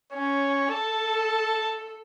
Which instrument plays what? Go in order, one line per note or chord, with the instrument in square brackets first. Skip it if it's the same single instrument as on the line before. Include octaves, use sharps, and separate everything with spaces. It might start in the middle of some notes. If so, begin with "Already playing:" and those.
[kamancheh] C#4 [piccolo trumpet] C#5
[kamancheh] A4 [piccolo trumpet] A5